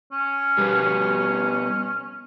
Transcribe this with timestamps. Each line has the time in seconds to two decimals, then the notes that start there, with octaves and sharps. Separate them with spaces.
0.12 C#4
0.57 B2 G3 B3